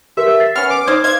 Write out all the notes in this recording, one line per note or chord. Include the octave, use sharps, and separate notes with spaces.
G4 A#4 B4 E5
A6 C7
B3 C#4 F6
B4 D6
D#4 C5 D5 F6 G#6
C5 D#5 F5 G#6